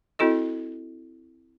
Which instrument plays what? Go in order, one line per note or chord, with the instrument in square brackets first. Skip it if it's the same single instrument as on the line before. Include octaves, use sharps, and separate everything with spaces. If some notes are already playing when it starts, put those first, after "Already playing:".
[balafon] C4 E4 F#4 A4 D#5